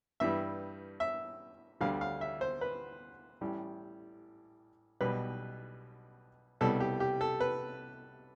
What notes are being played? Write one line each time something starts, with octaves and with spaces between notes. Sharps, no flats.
G2 E3 G3 E5
E5
D2 D3 G3 F5
F5
E5
C5
B4
A1 A2 G3
B1 B2 G3 B4
C2 B2 G3 A4
G4
G4
A4
B4